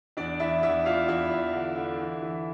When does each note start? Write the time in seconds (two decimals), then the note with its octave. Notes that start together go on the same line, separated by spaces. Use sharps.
0.17 E2 D4 D5
0.40 E2 E4 E5
0.63 E2 E4 E5
0.86 E2 F4 F5
1.08 E2 E4 E5
1.31 E2
1.53 D3
1.76 D3
1.99 E3
2.22 E3